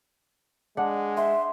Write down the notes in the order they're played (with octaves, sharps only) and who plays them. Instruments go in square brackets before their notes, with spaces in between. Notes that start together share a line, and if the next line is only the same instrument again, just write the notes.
[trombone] G#3 [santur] D4 [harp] F#5
[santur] C5 C6 [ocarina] E5